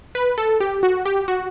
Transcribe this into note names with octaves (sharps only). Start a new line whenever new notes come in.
B4
A4
G4
F#4
G4
F#4